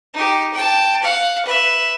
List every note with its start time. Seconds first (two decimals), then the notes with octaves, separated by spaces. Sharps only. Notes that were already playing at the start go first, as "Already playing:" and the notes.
0.14 D#4 G4
0.54 G5 A5
1.03 F5 F#5
1.45 B4 E5